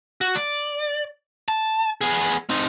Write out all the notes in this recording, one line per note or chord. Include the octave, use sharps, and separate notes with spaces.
F#4
D5
A5
B3 G#4
C4 D#4